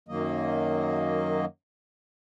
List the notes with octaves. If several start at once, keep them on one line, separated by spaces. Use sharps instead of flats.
F#2 D#3 F#3 A#3 D#5